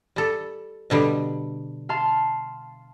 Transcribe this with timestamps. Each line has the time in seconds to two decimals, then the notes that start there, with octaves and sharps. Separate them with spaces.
0.16 G3 A4
0.90 B2 D3 G3
1.89 F5 A5 C6